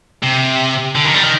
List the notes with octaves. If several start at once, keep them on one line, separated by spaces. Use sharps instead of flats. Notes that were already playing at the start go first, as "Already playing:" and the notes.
C3
D3
D#3
G3
D#3